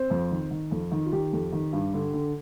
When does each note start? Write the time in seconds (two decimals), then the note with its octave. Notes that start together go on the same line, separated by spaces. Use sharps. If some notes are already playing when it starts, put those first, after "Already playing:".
Already playing: C4 C5
0.10 F2
0.31 D#3
0.51 D#3
0.71 F2
0.91 D#3
1.06 F4
1.12 D#3 G4
1.32 F2
1.52 D#3
1.73 G2
1.94 D3
2.13 D3